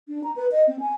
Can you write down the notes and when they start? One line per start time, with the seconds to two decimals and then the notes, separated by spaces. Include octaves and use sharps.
0.08 D4
0.24 A#5
0.36 B4
0.52 D#5
0.67 C4
0.80 G#5